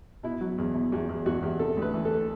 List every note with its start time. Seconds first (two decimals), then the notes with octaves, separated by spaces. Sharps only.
0.23 B2 E4
0.41 F#3
0.58 E2
0.75 B2
0.92 E2 F#4
1.09 E2
1.26 E2 F#4
1.42 E2 G4
1.59 C3 A4
1.77 D2
1.82 B4
1.93 E3
2.05 A4